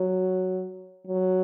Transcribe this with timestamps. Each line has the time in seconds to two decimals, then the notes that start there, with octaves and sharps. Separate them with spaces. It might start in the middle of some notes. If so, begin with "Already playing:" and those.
Already playing: F#3
1.07 F#3